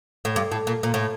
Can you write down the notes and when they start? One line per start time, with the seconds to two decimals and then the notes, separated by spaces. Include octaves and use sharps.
0.25 A2
0.36 G2
0.52 A2
0.67 A#2
0.83 A#2
0.94 A2